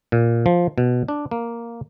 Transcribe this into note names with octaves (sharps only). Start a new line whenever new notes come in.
A#2
F3
B2
D4
A#3